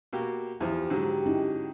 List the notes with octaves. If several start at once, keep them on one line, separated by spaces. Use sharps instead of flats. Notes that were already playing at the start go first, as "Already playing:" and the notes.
B2 A#3 G4
E2 F3 E4 G4
G#2 D3 F#3
C#4 D#4 E4